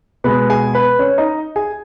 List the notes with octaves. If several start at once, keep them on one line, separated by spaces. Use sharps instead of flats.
B2 G#3 B3 B4 B5
G#4 G#5
B4 B5
C#4 C#5
D#4 D#5
G#4 G#5